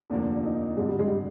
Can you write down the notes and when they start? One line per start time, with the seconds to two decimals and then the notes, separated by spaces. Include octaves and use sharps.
0.10 F1 D#2 D3 F3 A#3
0.36 D4
0.44 D#4
0.77 G#1 G2 D3 G#3
0.88 G3
0.99 G#3
1.08 G3